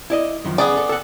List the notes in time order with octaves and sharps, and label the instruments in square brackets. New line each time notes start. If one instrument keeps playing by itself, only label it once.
[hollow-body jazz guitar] E4 D5 D#5
F#2 D#3 F3
[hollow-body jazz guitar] C#3 [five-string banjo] B3 G#4 D5
[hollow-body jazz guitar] A4
A4 F#5